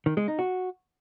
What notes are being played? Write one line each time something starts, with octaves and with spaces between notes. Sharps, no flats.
D#3
G#3
D#4
F#4